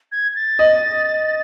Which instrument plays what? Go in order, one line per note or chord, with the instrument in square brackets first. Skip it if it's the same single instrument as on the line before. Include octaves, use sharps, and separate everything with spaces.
[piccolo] G#6
G#6
A6
[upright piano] D#5